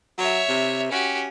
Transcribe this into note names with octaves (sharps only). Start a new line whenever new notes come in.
F#3 C#5 E5
C3
C#4 F#4 G4